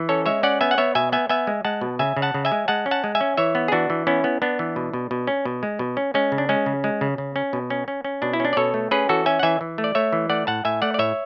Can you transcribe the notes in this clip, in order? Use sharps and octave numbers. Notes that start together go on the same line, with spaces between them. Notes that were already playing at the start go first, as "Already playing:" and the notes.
Already playing: E3
C#4 A4 C#5
G#3 C#5 E5
C#4 D5 F#5
B3 E5 G#5
F#5
B3 C#5 E5
B2 E5 G#5
B3 E5 G#5
B3 E5 G#5
G#3
G#3 F#5 A5
B2
C#3 E5 G#5
C#3
F#5 A5
C#3
E5 G#5
G#3
G#3 F#5 A5
C#4
F#5 A5
G#3
E5 G#5
C#4
E3 C#5 E5
B3
G#4
E3 D4 F#4
E3
B3 C#4 E4
B3
B3 D4
E3
B2
B2
B2
C#4
B2
G#3
B2
C#4
G#3 C#4
C#3
D4
G#3 C#4
C#3
G#3
C#3
C#3
C#4
B2
C#4
C#4
C#4
B2 D4
E4
C#4 D4
D5
B2 A4 C#5
A3
C#4 G#4 B4
E3 F#4 A4
C#4 E5 G#5
F#5
E3 E5 G#5
E3
A3
D5
A3 C#5 E5
E3
A3 D5 F#5
A2 F#5 A5
A2 E5 G#5
A3 D5 F#5
D5
A2 C#5 E5